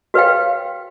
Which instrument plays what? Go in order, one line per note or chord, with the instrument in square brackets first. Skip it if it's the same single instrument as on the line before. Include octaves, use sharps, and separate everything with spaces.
[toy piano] F#4 B4 C#5 F5 G5